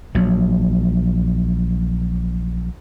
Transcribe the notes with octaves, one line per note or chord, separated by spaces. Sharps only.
A#1 F#3